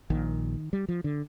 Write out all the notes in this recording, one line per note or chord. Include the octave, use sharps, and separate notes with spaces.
A#1 A#2 D#3
G3
F3
D3